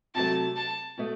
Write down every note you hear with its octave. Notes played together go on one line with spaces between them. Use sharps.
C3 F#3 A3 A5
A5
B2 A3